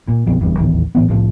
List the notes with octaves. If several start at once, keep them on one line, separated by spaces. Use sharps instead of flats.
A#2
A#1 F2 B2
F#1 E2 G2
D#1 A1 E2 D#3
A2 E3 B3
C2 A2 F3